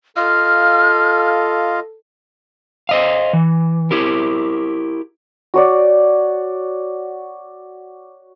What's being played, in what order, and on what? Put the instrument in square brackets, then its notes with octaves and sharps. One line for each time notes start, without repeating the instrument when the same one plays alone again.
[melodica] F4 D#5 F5 [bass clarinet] A4 [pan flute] F6
[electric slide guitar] C5 D#5 F5
E3
E4 G4 A#4
[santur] F#4 C#5 D5